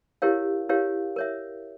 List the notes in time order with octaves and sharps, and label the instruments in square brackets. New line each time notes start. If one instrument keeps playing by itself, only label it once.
[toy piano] E4 G4 A#4 C#5 F5
E4 G4 A#4 C#5 F5
A#4 C#5 E5